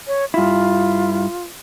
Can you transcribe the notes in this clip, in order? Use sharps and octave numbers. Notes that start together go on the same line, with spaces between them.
C#5
G2 E4 F4